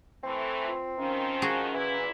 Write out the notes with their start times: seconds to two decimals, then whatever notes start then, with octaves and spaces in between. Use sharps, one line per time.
0.24 E3 A3 C4
0.65 F4
0.98 D#3 F3 C#4
1.42 F#4 G#4
1.74 A#2 E3 E4